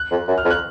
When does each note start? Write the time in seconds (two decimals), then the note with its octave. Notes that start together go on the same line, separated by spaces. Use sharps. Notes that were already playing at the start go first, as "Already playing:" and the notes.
Already playing: F#6
0.11 F2
0.28 F#2
0.38 F6
0.45 F2
0.50 F#6